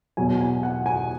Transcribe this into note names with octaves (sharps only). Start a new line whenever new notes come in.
E2 B2 F#3 G#5
G#5
F#5
G#5